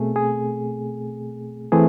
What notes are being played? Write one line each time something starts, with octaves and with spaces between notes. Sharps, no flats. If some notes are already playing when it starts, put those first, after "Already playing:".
Already playing: B2 A3 C4 G#4
G#4
E3 A3 C4 G#4